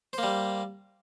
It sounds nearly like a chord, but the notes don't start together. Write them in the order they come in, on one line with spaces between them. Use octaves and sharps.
C5 A#3 G3